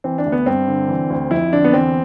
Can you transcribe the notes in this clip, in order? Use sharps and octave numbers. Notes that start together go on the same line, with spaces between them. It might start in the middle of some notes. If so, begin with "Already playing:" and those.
E3 C4
D4
D2
B3
G2 C4
D3
E3
D2
F2 E4
D3 D4
B3
E2 C4